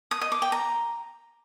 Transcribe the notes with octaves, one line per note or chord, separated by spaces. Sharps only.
D#6
D#5
D6
G5
A#5